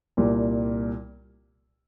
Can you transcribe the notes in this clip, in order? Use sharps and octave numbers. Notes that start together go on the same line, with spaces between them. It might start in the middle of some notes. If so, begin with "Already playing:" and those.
C2 A#2 G3